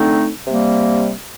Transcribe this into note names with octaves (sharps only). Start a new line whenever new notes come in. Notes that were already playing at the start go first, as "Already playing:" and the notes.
Already playing: D3 A3 C4 D#4
C3 G3 A#3